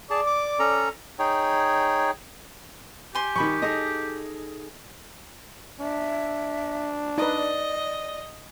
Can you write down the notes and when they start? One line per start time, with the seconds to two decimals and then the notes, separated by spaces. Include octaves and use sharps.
0.10 G#4 D5 A5
0.27 D6
0.59 C#4 A4 A#5
1.19 D#4 G#4 C#5 G5
3.15 G4 G#5 C6
3.36 D#3 G3 B5 C#6
3.62 D#4 G#4 A4 D#5 D#6
5.81 D4 E5
7.18 D#4 B4 D5 D#5